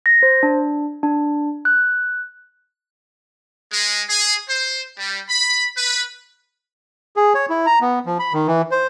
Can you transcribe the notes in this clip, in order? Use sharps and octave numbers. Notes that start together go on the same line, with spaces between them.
A#6
C5
D4
D4
F#6
G#3
G#4
C5
G3
B5
B4
G#4
C#5
E4
A#5
B3
F3
B5
D#3
E3
C5